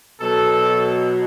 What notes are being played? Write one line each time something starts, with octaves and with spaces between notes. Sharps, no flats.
B2 F#3 A4